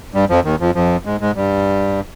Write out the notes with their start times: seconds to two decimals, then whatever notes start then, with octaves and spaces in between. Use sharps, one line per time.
0.14 G2 G3
0.29 F2 F3
0.45 D#2 D#3
0.60 F2 F3
0.75 F2 F3
1.06 G#2 G#3
1.21 G#2 G#3
1.36 G2 G3